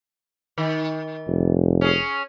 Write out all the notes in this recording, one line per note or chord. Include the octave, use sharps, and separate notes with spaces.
D#3
F1
C#4 G#4